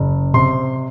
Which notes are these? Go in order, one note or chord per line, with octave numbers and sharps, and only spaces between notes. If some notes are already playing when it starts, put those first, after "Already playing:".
Already playing: F#1
C3 C6